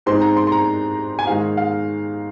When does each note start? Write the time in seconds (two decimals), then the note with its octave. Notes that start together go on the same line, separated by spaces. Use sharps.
0.06 G#2 G#3 C4 D#4 C6
0.21 A#5
0.37 C6
0.47 C6
0.52 A#5
1.19 G#5
1.27 G#2 D#3 G#3 D#4 F5
1.57 F5